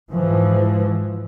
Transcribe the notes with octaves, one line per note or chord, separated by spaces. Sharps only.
G#2 E3 F3